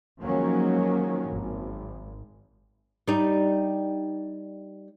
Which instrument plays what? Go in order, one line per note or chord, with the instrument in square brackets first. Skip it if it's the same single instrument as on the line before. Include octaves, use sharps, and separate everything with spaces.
[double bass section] D#3 F3 F#3 G#3 A#3 C#4
G#1
[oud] G3 D#4